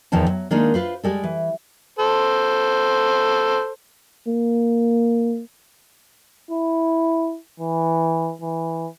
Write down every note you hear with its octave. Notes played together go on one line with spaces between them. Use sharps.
E2 G#2 D#3 F3 A5
F#3
D#3 G#3 A#3 D4 D#4 F4
F4 B4 C5
G3 G#3 A4
E3
A4 C5
A#3
E4
E3
E3